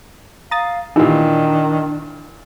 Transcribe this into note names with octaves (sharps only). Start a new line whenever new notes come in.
F5 A#5 D#6 A6
A#2 D#3 E3 D4 D#4 G4